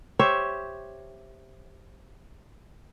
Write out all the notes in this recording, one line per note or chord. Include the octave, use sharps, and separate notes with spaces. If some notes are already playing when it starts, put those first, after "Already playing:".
G4 C5 C#5 E5